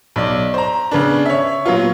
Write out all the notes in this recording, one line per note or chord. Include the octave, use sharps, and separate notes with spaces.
B1 D5
C5 A#5
C#3 B3 D4
C#5 E5
A#2 F#3 B3 F4